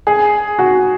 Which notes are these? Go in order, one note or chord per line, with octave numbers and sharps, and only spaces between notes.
G#4
F#4